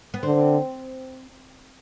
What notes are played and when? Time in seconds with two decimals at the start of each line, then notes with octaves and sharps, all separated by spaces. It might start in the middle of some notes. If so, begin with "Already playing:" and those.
0.14 B3
0.23 D3 C4